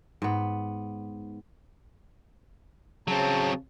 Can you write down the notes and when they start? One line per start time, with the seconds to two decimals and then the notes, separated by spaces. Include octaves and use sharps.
0.22 G#2 B3
3.08 C#3 F#3 C4 A5